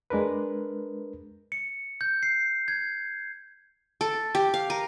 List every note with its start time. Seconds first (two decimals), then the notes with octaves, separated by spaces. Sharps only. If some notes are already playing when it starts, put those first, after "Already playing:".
0.10 G#3 D4 A#4 B4
1.52 C#7
2.01 G6
2.23 C7
2.68 G#6
4.01 A4
4.35 G4
4.54 F5
4.70 A#4